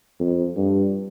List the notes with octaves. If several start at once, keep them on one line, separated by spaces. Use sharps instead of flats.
F2
G2